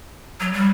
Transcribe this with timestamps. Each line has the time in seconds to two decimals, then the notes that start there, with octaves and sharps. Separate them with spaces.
0.40 F#3
0.53 G3